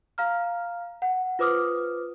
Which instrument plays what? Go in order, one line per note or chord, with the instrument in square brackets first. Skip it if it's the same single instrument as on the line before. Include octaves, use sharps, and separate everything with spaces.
[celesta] F5 A#5 F6
F#5
F4 B4 C5 D6 D#6 F6